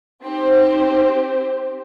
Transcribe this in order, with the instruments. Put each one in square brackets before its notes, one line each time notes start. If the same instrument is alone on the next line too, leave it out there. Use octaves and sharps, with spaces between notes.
[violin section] C4 G4 C5 [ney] D#4